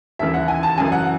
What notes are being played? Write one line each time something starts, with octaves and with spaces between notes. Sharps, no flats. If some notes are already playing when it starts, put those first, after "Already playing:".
D#2 C#3 E3 E5
F#5
G#5
A5
F#2 C#3 E3 G#5
F#5